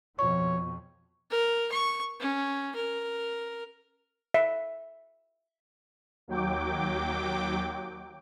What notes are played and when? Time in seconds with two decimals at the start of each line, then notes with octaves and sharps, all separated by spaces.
0.19 F2 B2 F3 C#5 C#6
1.31 A#4
1.72 C#6
2.20 C#4
2.75 A#4
4.34 E5
6.28 D#2 F#3 G5 D6